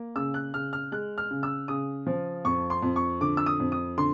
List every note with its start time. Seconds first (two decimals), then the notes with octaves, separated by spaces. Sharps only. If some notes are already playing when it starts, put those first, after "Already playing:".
Already playing: A#3
0.16 C#3 E6
0.34 F#6
0.54 C#3 F6
0.73 F6
0.92 G#3 F#6
1.18 F6
1.31 C#3
1.43 E6
1.68 C#3 D#6
2.07 F3
2.45 F2 C#6
2.70 C6
2.82 F2
2.96 C#6
3.21 D3 D6
3.37 E6
3.46 D#6
3.60 F2
3.72 D#6
3.98 D3 C6